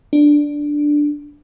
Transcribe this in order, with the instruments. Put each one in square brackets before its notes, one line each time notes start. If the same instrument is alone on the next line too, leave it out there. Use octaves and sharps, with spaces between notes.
[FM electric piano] D4